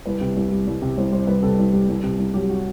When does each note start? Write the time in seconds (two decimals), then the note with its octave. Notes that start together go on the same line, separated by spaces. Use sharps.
0.06 C2 B4
0.21 C3
0.37 C2
0.52 G3
0.67 C2
0.82 C3
0.97 C2 C5
1.12 G3 C5
1.27 C2 B4
1.43 C3 A4
1.58 C2
1.73 G3
1.89 C2
2.03 C3
2.19 C2
2.34 F#3 G4
2.50 F#4